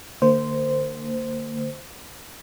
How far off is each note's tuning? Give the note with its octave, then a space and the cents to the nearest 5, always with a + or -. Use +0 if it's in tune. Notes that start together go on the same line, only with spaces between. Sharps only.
D3 +30 A#3 -35 C5 -10